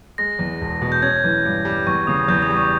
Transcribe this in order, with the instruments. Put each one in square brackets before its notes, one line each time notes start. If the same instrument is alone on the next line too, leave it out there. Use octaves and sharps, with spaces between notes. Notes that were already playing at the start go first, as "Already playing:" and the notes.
[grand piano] G#3 [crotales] A#6
[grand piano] E2
E1
B2
[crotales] G6
[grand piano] C#4 [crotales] G#6
[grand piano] E3
G2
G3
[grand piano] E2 [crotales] C#6
[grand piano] C#3 [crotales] D#6
[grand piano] E2 [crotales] G6
[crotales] D#6
[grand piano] G3
[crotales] C#6